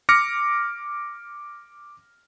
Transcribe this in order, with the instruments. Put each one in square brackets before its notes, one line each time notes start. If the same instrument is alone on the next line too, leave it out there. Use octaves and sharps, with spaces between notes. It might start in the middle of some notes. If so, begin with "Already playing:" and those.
[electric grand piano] D6 F6 A#6 C#7